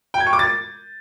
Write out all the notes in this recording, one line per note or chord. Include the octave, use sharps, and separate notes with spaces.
G5
G#6
C#6
D6
A6